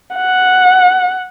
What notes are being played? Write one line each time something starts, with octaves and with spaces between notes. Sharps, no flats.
F#5